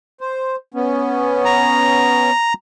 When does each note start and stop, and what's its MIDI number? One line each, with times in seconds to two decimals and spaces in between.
0.21 0.56 72
0.74 2.31 59
0.74 2.31 61
1.45 2.53 82